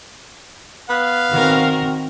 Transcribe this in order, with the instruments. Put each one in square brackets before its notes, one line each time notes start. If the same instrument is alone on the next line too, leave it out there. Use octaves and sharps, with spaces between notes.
[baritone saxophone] B3 [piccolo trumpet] F5
[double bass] D#3 C4 [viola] F#4 A#4